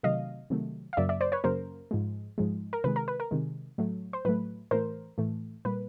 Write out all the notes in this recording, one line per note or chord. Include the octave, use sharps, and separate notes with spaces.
C3 D#3 F#3 A3 D#5 F5
C3 D#3 F#3 A3
F5
F#2 C#3 F#3 A#3 D5 E5
D5 E5
C5 D5
B4 C#5
F#2 C#3 F#3 A#3 A#4 C5
G#2 F3 G#3
G#2 F3 G#3
A#4
C3 D#3 G#3 B4
A#4
B4
A#4
C3 D#3 G#3
A2 F#3 A3
C5
A2 F#3 A3 B4
A2 E3 A3 A#4 C5
A2 E3 A3
A#2 G3 A#3 B4